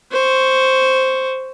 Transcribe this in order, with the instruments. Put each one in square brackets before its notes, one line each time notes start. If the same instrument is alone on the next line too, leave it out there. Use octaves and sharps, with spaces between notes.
[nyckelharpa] C5 C#6